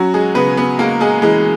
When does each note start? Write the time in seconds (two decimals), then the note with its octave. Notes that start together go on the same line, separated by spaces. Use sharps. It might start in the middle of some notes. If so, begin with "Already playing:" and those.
Already playing: F#3 C#4 F#4
0.14 G#3 G#4
0.35 C#3 B3 B4
0.57 B3 B4
0.79 G#3 A#3 A#4
1.01 G#3 G#4
1.22 E3 G#3 G#4